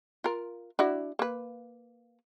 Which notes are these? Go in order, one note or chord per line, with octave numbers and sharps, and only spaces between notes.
F4 A#4
D4 E4 F#4
A#3 B4